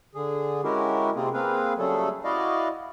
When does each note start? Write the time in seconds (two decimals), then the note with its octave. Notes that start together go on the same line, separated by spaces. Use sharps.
0.15 D3 G#4
0.64 G#3 C#4 E4 F#4 G4 A#4
1.15 C3 A#3 C4 F4 G#4
1.34 A#3 C4 G#4 B4 F5
1.78 C#3 F#3 G3 A3 G#4 A4
2.24 E4 F#4 D5 D#5 F5